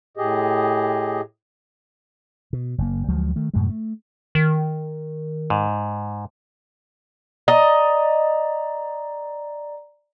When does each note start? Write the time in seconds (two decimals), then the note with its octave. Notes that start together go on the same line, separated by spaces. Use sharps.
0.17 A2 G4 G#4 D#5
2.53 B2
2.78 F#1 A#3
3.08 D2 F3 F#3 G#3
3.36 D#3 A3
3.54 F#2 A2 C3 G#3
3.69 A3
4.35 D#3
5.50 G#2
7.48 D5 D#5 A#5